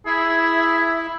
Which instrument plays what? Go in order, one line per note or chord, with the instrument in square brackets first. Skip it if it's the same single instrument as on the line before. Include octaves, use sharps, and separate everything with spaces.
[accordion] E4 [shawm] G#4 [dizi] E5